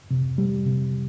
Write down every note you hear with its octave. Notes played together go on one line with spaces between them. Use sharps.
C3
G3
C3